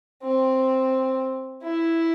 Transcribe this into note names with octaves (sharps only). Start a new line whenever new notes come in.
C4
E4